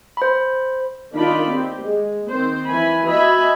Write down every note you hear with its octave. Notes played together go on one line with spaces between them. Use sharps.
C5 B5
D#3 D4 D#4 F4 D5 B5
C4 G4
G#3
D#3 C4 C5
E3 G#5 B5
F#4 D#5 E5 G#5 B5